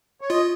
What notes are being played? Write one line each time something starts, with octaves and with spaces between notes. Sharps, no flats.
C#5
F4 D#5